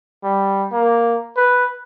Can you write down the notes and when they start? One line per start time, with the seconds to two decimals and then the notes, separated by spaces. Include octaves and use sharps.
0.24 G3
0.72 A#3
1.37 B4